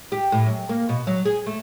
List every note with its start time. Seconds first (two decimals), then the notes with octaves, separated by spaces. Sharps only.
0.12 G4
0.32 A2
0.46 F#2
0.69 A#3
0.89 B2
1.07 F#3
1.25 G#4
1.46 A3